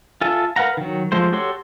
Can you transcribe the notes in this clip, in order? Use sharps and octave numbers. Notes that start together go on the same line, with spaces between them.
F4 A4 E5 G#5
A#4 B4 F5 F#5 A#5
D#3 F#3
F3 G#3 A3 C5
F#4 G4 A4 C#5 C6